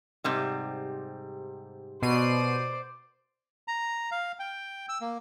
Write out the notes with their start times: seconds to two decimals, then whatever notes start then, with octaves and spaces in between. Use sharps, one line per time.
0.24 G#2 C3 G3
2.02 B2 C5 D5 C7 D#7
3.68 A#5
4.11 F5
4.39 G5
4.89 E6
5.01 A#3